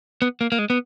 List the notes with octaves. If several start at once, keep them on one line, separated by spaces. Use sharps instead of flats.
B3
A#3
A#3
G#3
B3